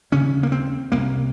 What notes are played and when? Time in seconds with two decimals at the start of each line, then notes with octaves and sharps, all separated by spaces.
0.12 D#2 C#3 C#4
0.43 A#3
0.52 C4
0.92 C2 C3 A#3